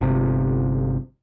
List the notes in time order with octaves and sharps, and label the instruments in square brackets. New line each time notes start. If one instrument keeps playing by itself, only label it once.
[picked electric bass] G1 C3